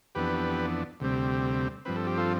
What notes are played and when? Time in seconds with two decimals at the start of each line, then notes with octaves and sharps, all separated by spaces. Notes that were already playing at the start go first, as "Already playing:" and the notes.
0.15 F2 E3 B3 D4 G4 B4
1.00 D2 C3 G3 C4
1.85 G2 F3 C4 B4
1.96 A4
2.07 G4
2.17 F4 A4